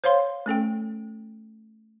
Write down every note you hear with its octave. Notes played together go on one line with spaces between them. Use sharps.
C5 C#5 F5 C6
A3 C#4 A4 G5